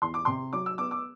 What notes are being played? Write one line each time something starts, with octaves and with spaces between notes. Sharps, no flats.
E2 C6
D6
C3 C6
F#3 D6
E6
B3 D6
D6